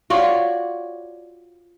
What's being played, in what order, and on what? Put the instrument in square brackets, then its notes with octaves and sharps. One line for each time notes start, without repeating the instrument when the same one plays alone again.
[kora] F4 F#4 C#5 D5